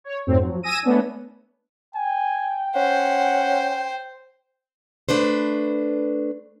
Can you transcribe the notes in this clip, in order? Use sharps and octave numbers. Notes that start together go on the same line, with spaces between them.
C#5
F2 G#2 F#3 A3 C4
F3 F#3
G#5 D#6 E6 A#6 D#7
A3 B3 C#4 D4
G5 G#5
C#4 C5 F#5
A3 D4 B4 C5